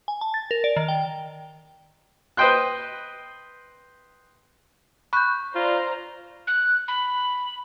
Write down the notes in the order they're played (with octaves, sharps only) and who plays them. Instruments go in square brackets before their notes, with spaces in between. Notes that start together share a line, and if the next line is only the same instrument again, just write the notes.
[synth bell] G#5
A5
A6
A#4
D5
D#3
G5
[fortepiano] B4 C5 D#5 G5 C6 F#6
[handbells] B5 G6 [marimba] C#6 F#6
[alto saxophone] F4 [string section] C5 D5 A#5
[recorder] F#6
B5